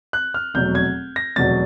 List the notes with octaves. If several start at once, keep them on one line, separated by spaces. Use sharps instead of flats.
F#6
F6
F1 E2 B2 F#3 G6
G#6
A#6
F1 E2 B2 F#3 A6